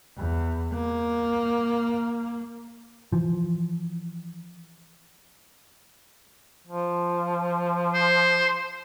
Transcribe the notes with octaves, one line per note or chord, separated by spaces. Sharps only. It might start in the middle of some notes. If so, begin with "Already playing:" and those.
E2
A#3
E3 F3
F3
C5